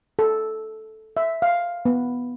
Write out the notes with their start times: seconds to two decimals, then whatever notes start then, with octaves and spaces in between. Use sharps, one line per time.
0.19 A4
1.17 E5
1.42 F5
1.85 B3